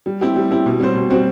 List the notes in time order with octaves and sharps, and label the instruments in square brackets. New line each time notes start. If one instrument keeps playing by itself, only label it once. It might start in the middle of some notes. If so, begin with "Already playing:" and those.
[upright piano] G3
C4 E4 G4
G3
C4 E4 G4
B2
G3 C4 F#4 C5
B2
G3 C4 F#4 C5